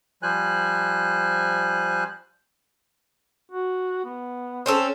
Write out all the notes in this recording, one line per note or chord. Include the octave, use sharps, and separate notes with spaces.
F3 G3 C5 G#5 F#6
F#4
B3
C4 C#4 A4